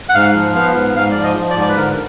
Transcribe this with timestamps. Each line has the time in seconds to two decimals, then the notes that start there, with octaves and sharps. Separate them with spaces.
0.09 F#5
0.15 G#2 F5
0.34 F3
0.55 B3 F5
0.76 G#2
0.96 G#2 F5
1.11 F3 D5
1.24 D#5
1.37 F3
1.51 D5
1.57 G#2
1.62 D5
1.69 B4
1.77 D3 A#4